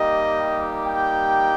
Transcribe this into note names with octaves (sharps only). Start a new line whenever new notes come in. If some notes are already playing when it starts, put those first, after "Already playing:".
Already playing: G3 A#3 D#4 G4 D#5
G5